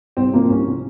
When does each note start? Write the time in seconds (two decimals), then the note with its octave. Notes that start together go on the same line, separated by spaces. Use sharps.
0.17 C2 C4
0.33 C3 F3 A#3
0.50 C2 C#4
0.67 C3 F3